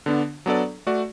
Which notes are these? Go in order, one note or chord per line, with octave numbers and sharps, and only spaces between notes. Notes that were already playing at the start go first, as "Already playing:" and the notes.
D3 B3 D4
F#3 B3 D4 A4 D5
A3 F#4 D5